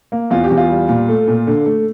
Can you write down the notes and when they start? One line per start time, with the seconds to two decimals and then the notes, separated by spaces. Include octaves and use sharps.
0.12 A#3
0.30 E2 F4
0.44 G4
0.50 E2
0.58 F4
0.69 G3
0.89 A#2
1.09 A3
1.28 A#2
1.47 D3
1.66 A3